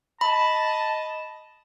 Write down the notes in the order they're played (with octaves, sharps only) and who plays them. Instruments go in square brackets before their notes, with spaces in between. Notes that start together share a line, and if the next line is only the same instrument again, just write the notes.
[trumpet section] D#5 A5 [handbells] B5